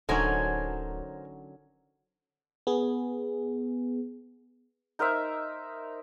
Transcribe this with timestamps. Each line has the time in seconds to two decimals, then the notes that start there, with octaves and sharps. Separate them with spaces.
0.09 D1 D3 F#3 C#4 D#4 A#4 C5 G#5
2.67 B3 G#4
4.99 D#4 A#4 C5 E5